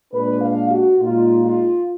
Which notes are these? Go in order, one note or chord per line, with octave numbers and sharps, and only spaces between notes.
A#2 G#3 D4 B4
F5
F#4
A#2 G#3 D#4 F4
F4